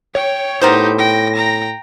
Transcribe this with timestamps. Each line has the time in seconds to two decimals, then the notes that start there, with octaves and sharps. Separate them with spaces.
0.15 C#5 G5
0.62 A2 B3 D#4 G4 A#4 C5 G6
0.99 G5 A#6
1.36 G5 A#5